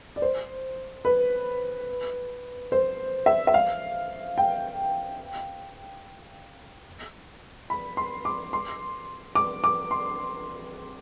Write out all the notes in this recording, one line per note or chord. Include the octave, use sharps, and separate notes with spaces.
D5
C5
B4
C5
E5
E5
F5
G5
B5
C6
D6
C6
D6
D6
C6